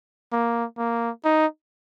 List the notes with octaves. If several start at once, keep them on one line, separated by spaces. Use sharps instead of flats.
A#3
A#3
D#4